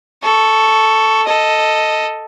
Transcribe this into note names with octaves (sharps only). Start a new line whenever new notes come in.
A4 C#6
A4 D#5